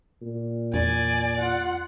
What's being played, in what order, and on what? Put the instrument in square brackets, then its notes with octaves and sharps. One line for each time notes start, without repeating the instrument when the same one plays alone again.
[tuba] A#2
[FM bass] E2 [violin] D5 [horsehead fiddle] G#5
[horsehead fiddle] F4 F#5